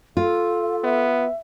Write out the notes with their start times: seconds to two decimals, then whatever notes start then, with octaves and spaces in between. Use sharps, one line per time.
0.17 F4 A4 F5
0.84 B3 E5